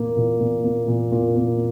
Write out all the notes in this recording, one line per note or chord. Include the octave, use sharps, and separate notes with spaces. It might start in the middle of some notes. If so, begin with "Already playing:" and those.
Already playing: A#2 A#3
A#2
A#2
A#3
A#2
A#2
A#3